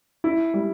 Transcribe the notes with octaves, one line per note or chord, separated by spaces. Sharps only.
E4
G3